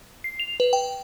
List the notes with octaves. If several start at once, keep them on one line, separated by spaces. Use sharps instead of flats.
C7
F7
B4
G5